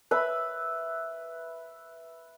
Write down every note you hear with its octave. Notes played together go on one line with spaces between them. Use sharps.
B4 E5 B5